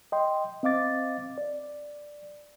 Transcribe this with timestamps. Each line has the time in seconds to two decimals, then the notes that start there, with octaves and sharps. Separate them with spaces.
0.12 D#5 G5 C6
0.63 C4 D#5 F5 D6 A6
1.38 D5